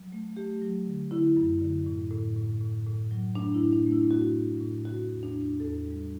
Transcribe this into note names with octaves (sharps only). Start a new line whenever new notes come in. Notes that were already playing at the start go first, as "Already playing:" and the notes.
Already playing: F#3
A3
A3 G4
F#3
D3
D3 E4
F#2
D3
A2
A2
A2
A2
A2
F#3
A3 D4
E4
A2
D4
A3
E4
A2 F#4
A2
A2
C#3 F#4
E2
D4
E2
E2 A4
G3